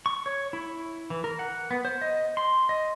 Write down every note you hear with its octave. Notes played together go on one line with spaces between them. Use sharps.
C#6
C#5
E4
E3
A#4
F#5
B3
C5
D#5
C6
D#5